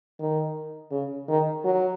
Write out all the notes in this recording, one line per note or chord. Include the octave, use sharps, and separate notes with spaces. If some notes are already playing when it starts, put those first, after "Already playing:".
D#3
C#3
D#3
F#3